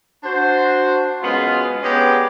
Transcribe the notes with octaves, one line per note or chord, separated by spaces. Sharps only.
D4 F#4 C5
F#2 G#3 B3 F4
G#3 B3 C#4 D4 G4